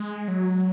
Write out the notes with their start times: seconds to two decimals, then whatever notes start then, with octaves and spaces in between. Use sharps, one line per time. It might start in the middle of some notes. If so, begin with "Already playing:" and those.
Already playing: G#3
0.28 F#3